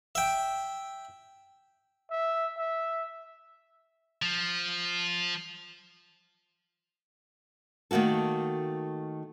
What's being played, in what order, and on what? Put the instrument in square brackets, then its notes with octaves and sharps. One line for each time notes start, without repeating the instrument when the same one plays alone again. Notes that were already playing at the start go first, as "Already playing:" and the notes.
[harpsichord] E5 G5
[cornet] E5
E5
[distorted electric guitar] F3
[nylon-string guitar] D#3 A3 A#3 F#4 A4